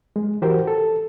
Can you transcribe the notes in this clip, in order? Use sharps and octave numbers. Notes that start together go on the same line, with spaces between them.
G#3
E3 F#4 G4 A#4 C5
A4